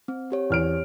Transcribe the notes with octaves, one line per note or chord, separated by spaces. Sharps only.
C4
C4 G4 C#5
E2 F6 D7